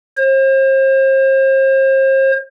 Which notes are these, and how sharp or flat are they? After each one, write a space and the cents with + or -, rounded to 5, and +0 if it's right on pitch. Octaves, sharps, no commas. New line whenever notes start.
C5 +40